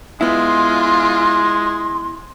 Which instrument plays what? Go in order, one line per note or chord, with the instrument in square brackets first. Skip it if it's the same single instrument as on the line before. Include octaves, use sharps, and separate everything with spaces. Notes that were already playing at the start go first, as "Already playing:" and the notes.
[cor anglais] G#3 [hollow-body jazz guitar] B3 E4 [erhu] F4 [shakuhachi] C6